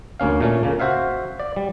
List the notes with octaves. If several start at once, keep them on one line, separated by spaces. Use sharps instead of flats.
D2 A#3 C#4 F5
A#2 A3 C#4
C#3 A#3
F#4 C5 E5 F5
D5
G3